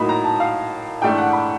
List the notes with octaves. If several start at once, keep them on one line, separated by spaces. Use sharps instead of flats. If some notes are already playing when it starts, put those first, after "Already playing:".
Already playing: A2 F#3 A#3 D#4 B5
A#5
A5
F5
G#2 E3 A3 D4 G5
F#5
B5